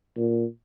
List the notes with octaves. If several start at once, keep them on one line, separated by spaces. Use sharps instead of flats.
A#2